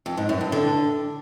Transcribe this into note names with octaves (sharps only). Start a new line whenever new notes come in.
F2
G#2
F#2
G2
D3